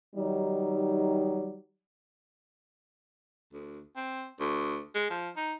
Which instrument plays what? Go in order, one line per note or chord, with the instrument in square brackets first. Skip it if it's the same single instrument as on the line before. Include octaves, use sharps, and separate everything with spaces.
[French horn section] D#3 F#3 G3 D#4 G4
[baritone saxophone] D2
C4
D2
G#3
F3
D#4